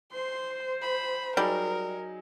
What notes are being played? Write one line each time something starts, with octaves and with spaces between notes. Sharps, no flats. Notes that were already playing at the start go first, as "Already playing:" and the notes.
C5 C6
B5
F#3 G3 D#4 G#4 A#4